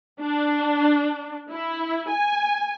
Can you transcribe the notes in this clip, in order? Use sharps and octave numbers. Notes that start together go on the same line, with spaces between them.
D4
E4
G#5